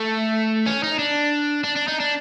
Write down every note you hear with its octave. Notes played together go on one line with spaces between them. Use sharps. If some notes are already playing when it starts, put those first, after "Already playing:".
Already playing: A3
C#4
D#4
D4
D4
D4
D#4
D4